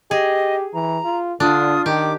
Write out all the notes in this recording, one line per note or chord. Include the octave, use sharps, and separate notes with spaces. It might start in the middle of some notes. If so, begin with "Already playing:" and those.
G4 G#4 D#5
E3 A#5
F4
D3 D4 F4 D#6
D#3 G4 D6